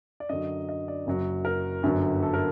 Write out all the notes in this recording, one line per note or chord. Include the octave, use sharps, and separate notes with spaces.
D5
F#2 D3 F#3 D#5
D#5
D5
F#1 F#2 F#3
A#4
G1 F#2 D3 F#3
A4
A#4